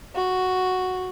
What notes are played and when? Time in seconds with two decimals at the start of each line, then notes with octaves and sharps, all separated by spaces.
0.15 F#4